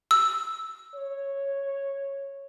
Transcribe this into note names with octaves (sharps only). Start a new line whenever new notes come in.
E6
C#5